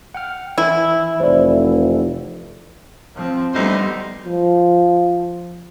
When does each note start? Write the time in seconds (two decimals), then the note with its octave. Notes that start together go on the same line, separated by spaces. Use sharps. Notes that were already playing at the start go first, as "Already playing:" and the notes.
0.15 F#5 G5 F6
0.58 E3 E4
1.20 F1 C5 D5
3.15 F3 C4
3.54 D2 G3 B3 D#4 C5
4.26 F3